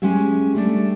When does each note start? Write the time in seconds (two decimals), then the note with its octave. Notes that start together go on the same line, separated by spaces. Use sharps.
0.02 G#3 C#4 G4 G#4 E5
0.55 G3 A3 D4